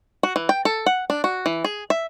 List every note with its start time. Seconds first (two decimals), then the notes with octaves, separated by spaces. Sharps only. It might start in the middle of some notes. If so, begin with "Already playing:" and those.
0.23 F#4
0.36 E3
0.49 G5
0.65 A4
0.86 F#5
1.10 D4
1.24 F#4
1.46 E3
1.64 G#4
1.90 E5